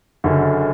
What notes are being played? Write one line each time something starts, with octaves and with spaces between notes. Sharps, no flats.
F#1 F#2 D3